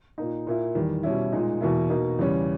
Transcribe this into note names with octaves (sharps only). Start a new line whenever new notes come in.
A#2 A#3 D#4
A#2 A#3 E4
E2 D#3 G3
B2 G3 C#4 E4
A#2 G#3 D#4
E2 B2 A#3 E4
B2 A#3 D#4
E2 C#3 G3 C#4